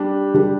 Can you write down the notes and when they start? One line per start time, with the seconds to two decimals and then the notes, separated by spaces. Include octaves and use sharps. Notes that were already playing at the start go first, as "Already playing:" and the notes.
Already playing: G3 D4 G4
0.34 G3 D4 G4